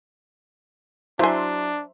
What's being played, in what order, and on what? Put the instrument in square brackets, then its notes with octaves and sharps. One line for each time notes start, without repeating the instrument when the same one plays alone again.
[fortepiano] F#3 [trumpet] D4 [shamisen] E4 G#5 [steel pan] C5 E5 C6